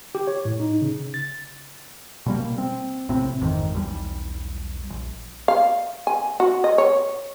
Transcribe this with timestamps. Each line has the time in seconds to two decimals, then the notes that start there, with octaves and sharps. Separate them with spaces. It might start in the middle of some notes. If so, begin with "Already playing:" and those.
0.15 G4
0.27 C#5
0.45 A2
0.60 D#4
0.82 C#3
1.14 A6
2.26 B2 G3 A#3
2.58 C4
3.09 A#1 A2 C3 C4
3.41 A1 F2 G#2 D#3
3.74 B1 E2 G3
4.90 A#1
5.48 F5
6.07 G#5
6.40 F#4
6.64 D#5
6.78 C#5